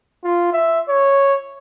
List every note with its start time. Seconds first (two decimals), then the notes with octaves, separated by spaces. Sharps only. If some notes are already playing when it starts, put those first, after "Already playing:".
0.24 F4
0.53 E5
0.89 C#5